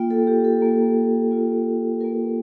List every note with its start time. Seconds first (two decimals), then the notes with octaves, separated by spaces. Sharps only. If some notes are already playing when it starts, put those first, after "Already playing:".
Already playing: A#3 F4 G5
0.10 A4
0.27 G4
0.45 A4
0.62 A#3 F4
1.31 A#3 F4
2.00 A#3 F4 A#4